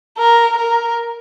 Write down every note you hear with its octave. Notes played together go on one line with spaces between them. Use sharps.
A#4
A#4